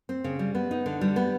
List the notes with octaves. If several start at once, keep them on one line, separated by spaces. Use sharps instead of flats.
C4
C#3
G3
B3
D#4
D3
G3
B3